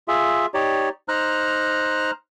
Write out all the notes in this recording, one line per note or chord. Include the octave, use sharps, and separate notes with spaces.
F4 G#4 E5
D#4 G4 C#5 D5
D#4 C5 A#5 F6 F#6